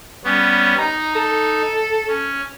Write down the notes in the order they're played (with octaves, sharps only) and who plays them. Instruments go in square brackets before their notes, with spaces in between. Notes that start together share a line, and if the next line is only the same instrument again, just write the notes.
[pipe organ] G3 B3 C#4
[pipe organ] D#4 [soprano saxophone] A#5
[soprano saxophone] A4
[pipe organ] C#4